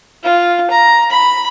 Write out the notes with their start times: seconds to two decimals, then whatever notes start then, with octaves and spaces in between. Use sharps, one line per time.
0.23 F4
0.71 A#5
1.11 B5